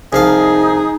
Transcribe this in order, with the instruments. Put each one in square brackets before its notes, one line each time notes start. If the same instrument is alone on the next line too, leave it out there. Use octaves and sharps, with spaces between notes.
[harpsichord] C2 F3 F5 [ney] D#4 [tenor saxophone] G#4